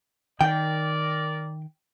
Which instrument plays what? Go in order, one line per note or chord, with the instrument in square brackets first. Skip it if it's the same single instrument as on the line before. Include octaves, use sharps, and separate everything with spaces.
[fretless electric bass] D#3 [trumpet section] A#4 D5 [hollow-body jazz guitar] G5